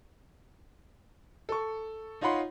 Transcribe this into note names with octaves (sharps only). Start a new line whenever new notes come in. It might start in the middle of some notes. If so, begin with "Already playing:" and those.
A4 C#6
D#4 F4 C#5 F#5 B5 C6